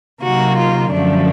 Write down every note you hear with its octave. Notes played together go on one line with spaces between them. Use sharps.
C3 D#3 F#3 A#3 F#4
F4
F#2 D3 F3 A3 D4